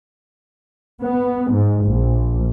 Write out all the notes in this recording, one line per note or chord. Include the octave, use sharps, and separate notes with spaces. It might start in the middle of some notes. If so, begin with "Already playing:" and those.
B3
G#2
A#1